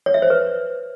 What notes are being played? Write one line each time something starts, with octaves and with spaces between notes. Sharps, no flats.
C#5
E5
C5
B4